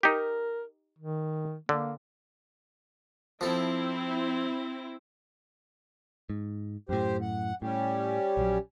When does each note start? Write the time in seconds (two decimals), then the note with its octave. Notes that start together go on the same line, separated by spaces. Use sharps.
0.03 D#4 G4 A#4
0.99 D#3
1.69 D3 A#3
3.41 F3 C4 E4 A4
6.30 G#2
6.89 F#2 A2 G4 C5
7.21 F#5
7.62 A2 G3 C#4 G4
8.37 A#1 F#3